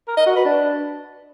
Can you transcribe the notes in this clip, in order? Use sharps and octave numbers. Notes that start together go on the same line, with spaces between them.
A#4
D#5
F#4
B4
D4